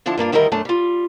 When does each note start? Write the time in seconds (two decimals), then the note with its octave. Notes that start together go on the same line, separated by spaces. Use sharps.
0.06 D3 F3 D4 E4 A5
0.17 G2 A#3 D4 F4
0.32 D2 D#3 G3 E4 A#4 D#5
0.52 F#2 A3 D4 A5
0.65 G3 F4